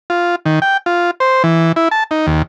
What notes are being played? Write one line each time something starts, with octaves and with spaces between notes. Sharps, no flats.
F4
D#3
G5
F4
C5
E3
E4
A5
D#4
D#2